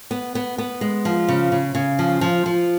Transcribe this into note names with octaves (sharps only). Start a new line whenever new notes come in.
B3
B3
B3
G#3
F3
C#3
C#3
C#3
F3
F3
F3